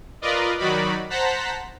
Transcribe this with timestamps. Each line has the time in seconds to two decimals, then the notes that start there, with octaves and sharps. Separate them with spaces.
0.22 F4 A#4 B4 D5 D#5
0.59 D#3 F#3 D#4 F#4 D5 B5
1.10 C5 F#5 A5 A#5 B6